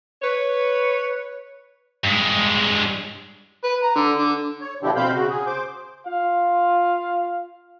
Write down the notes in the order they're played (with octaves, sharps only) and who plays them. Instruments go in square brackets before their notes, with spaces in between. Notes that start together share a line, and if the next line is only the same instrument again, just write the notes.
[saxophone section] B4 C#5
[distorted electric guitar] G2 G#3
[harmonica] B4
A#5
D3
D3
[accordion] C#5
B2 D3 F3 D4 E4 G4
B2 C4 C5 F5 B5 G6
C#3 F#4
G#4
C5 D6
[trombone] F4 [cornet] F5